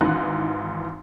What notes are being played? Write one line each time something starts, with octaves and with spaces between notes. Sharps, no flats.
G#1 G#2 E3 D#4 F#6